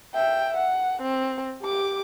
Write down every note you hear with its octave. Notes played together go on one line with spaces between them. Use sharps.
E5 G5
F#5
C4
G4 D6